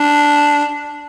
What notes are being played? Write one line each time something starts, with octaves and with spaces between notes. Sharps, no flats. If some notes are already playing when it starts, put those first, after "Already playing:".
Already playing: D4